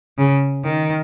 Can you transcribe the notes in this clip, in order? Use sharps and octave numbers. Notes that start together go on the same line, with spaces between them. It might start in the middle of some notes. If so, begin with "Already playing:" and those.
C#3
D#3